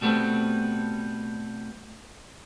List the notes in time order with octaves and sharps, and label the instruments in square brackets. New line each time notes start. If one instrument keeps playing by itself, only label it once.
[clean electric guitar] B2 G3 A3 B3 C4